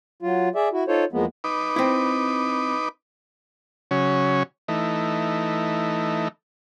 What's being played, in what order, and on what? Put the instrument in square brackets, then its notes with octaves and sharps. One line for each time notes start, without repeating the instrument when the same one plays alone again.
[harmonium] F#3 F4
G#4 D5 E5
E4 F#4
D#4 F4 A4 C5 C#5
E2 F3 G#3 A#3 B3
[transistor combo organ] D#4 B4 D6
[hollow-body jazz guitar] C4 E4
[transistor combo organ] C#3 F#3 C#4
E3 A3 D#4